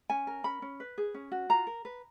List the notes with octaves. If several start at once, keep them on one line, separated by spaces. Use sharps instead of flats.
C#4 G#5
A#4
C#4 B5
C#4
B4
G#4
C#4
F#4
F4 A#5
A#4
B4